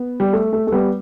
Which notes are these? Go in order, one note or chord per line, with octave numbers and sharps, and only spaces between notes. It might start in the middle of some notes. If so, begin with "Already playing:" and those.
Already playing: B3
G3
A3
A3
A3
G3 B3